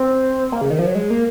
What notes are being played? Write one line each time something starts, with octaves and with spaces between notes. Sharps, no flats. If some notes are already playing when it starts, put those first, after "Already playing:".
Already playing: C4
A#3
C#3
D#3
F3
F#3
G#3
A#3